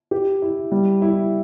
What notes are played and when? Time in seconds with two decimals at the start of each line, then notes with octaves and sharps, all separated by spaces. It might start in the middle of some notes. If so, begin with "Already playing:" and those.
0.11 G4
0.42 E4
0.72 G3
1.02 E4